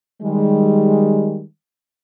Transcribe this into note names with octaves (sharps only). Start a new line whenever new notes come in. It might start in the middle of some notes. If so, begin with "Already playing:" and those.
D#3 G3 G#3